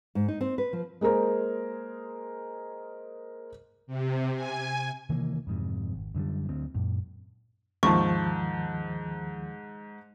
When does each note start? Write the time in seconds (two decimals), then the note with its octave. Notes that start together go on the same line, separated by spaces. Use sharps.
0.15 G#2
0.28 D#4
0.41 C4
0.58 B4
0.73 F3
1.01 G#3 A#3 G#4 A#4 C5
3.87 C3
4.36 G#5
5.09 C3 D#3 E3 A#3
5.47 F2 G#2 C3
5.94 G#1
6.15 F#2 D3 D#3 G3
6.49 D2 C4
6.74 F#2 A#2
7.83 D#2 G#2 D#3 F3 A5 C#6